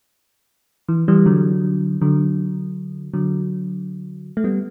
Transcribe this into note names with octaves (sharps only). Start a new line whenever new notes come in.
E3
E3 G3
D3 F#3
D3 F#3
D3 F#3
A3
G3 B3